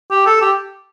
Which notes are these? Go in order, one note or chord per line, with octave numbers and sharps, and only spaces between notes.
G4
A4
G4